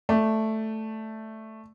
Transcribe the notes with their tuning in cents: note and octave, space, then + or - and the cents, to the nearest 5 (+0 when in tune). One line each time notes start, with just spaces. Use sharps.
A3 +0 D5 +0